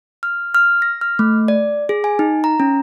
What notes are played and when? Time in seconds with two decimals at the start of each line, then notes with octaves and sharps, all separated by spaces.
0.23 F6
0.55 F6
0.82 A#6
1.01 F6
1.19 A3
1.48 D5
1.89 G#4
2.04 G#5
2.19 D#4
2.44 A#5
2.60 C#4